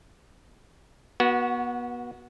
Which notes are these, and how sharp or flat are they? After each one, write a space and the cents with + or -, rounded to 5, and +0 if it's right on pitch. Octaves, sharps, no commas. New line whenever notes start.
B3 -30 F#4 +0